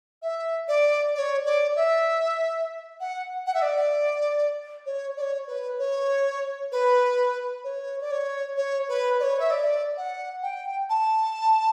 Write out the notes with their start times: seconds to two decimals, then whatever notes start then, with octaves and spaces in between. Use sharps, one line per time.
0.22 E5
0.68 D5
1.15 D5
1.19 C#5
1.45 D5
1.76 E5
3.00 F#5
3.46 F#5
3.54 E5
3.62 D5
4.86 C#5
5.17 D5
5.22 C#5
5.48 B4
5.79 C#5
6.72 B4
7.64 C#5
8.01 D5
8.11 C#5
8.57 C#5
8.89 B4
9.20 D5
9.23 C#5
9.39 E5
9.51 D5
9.97 F#5
10.43 G5
10.89 A5